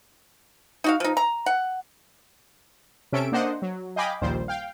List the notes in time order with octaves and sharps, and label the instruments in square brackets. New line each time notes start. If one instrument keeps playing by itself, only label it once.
[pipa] D#4 F#4 F5
F3 D#4
A#5
F#5
[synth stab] C3 C#4 A4 E5 D7
A#3 D4 C5 D#5 F#5
F#3
D#5 F5 G5 G#5 B5 D6
A#1 D#2 A#2 G3 C5
F5 G5